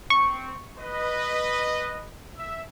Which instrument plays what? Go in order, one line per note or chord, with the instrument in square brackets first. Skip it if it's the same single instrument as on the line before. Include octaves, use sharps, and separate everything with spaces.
[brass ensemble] C4 [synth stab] C#6
[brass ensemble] B4 D#5
E5